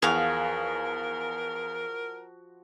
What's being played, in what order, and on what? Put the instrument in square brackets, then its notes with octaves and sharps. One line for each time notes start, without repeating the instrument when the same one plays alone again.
[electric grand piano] E2 [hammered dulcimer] F3 F#4 [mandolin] G#4 F5 [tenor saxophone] A#4